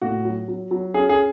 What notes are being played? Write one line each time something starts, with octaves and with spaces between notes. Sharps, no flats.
A2 F#4
F#3
F#3
F#3
C#4 G#4
G#4